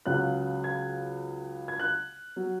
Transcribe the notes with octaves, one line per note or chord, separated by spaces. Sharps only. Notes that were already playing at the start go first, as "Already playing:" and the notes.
C#2 C#3 F#3 F#6
G#6
G#6
F#6
F#3